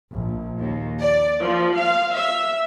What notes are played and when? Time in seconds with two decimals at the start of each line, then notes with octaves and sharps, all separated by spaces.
0.11 A#1
0.58 D#2
1.00 D5
1.42 F3
1.78 F5
2.15 E5